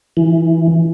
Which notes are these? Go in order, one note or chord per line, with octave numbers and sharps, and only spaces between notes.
E3